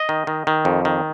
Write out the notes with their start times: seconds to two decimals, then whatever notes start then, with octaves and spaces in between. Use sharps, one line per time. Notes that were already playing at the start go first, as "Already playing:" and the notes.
Already playing: D#5
0.09 D#3
0.27 D#3
0.47 D#3
0.65 F2
0.85 D#3